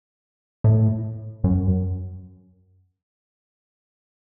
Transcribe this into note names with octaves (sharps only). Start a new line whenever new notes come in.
A2
F#2